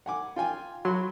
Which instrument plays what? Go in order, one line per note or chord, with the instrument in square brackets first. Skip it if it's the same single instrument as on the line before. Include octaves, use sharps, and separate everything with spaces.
[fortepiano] F#5 G#5 D6
F4 G5 G#5
[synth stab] F#3 [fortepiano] B5 C6